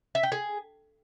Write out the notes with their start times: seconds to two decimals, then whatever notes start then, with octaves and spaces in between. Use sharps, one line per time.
0.15 E5
0.23 G5
0.32 G#4